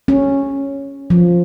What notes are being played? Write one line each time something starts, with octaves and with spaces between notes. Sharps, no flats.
C#4
F3